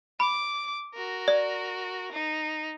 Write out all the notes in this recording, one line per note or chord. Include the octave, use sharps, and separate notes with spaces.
B5 D6
F#4 A#4
D5
D#4